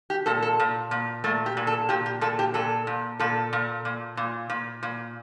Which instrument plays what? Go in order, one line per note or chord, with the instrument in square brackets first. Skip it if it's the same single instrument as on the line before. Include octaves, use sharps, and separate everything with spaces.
[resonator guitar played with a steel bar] G4
A#2 A4
A4
A#2
A#2
A#2 A3
G4
A#2
A4
A#2 G4
G4
A#2 A4
G4
A#2 A4
A#2
A#2 A4
A#2
A#2
A#2
A#2
A#2